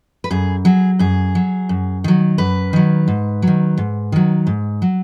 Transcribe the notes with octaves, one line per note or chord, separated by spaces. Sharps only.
B4
F#2 G#4
F#3 G#4
F#2 G#4
F#3
F#2
D#3 F#3
F#2 B4
D#3 F#3
G#2
F#3
D#3
G#2
D#3 F#3
G#2
F#3